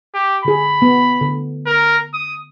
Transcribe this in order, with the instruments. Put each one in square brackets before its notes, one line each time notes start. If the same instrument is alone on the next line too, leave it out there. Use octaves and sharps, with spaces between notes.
[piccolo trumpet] G4
[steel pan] D3 G#4 [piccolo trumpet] B5
[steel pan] B3
D3
[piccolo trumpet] A#4
D#6